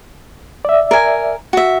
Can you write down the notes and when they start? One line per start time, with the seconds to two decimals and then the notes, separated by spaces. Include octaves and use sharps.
0.65 D5 E5
0.91 A#4 G#5
1.53 F#4 E5